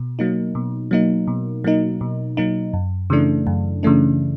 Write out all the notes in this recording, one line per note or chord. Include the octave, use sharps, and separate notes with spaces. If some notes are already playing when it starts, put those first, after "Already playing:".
Already playing: B2
F#3 A#3 D#4
B2
F#3 A#3 D#4
B2
F#3 A#3 D#4
B2
F#3 A#3 D#4
F#2
C#3 E3 A3 D4
F#2
C#3 E3 A3 D4